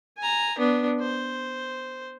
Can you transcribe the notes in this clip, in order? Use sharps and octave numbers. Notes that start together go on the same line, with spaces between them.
G#5 A#5
B3 D4
C5